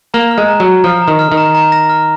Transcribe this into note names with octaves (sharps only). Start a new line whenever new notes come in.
A#3 A#5
F6
G#3
A#5
F#3
A#5
F3 F6
A#5
D#3
F6
D#3
A#5
A#5
A#6
F6